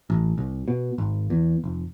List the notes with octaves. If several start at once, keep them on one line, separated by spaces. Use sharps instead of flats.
A1
C2
B2
G#1
E2
F1